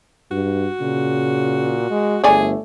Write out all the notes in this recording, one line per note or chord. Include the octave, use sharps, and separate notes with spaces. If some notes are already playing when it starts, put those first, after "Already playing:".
G2 F#4
A#2 C#3
G#3
G1 A3 G#4 C#5 D5 G#5